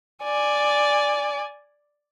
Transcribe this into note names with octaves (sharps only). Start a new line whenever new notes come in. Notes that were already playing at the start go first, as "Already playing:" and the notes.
D5 G#5